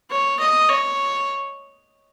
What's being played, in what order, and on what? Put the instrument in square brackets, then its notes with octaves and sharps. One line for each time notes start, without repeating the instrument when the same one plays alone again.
[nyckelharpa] C#5
D#5
C#5